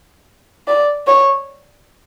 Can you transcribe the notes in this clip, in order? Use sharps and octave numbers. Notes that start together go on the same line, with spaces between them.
D5
C#5